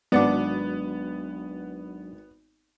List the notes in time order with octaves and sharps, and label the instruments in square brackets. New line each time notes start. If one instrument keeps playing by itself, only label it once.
[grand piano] G#1 [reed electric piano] F#3 D4 [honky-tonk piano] B3 [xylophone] D5 F#5 D6